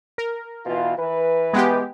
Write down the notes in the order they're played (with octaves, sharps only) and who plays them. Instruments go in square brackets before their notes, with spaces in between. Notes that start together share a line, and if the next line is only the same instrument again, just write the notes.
[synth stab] A#4
[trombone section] B2 E3 F4
E3 B4
[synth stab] G#3 B3 G4